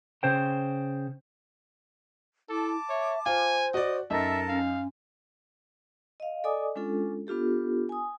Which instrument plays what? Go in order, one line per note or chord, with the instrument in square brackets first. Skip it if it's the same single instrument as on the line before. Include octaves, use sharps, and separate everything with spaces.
[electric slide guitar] C#3 C5 G5
[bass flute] E4 [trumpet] A4 [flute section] A5 D6
[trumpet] C#5 [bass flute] E5
[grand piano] F4 [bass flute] C5 [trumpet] G#5
[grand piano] F#4 D5 [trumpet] D#5
[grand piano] F#2 D#4 [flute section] A4 A#4 A5 [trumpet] E5
[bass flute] C#4 [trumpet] F5
[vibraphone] D#5 F5
A4 D5 D#5 G#5 D6 D#6
G#3 C#4 D4 F4 A4
B3 D4 F4 G4 A4
G#5 D#6